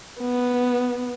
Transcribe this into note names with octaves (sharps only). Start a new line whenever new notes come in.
B3